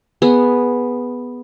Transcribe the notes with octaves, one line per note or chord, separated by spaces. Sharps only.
B3 G#4